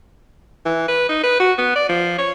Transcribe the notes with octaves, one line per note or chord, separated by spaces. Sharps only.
E3
B4
D#4
B4
F#4
B3
D5
F3
C#5